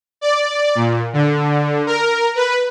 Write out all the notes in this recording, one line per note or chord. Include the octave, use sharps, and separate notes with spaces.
D5
A#2
D3
A#4
B4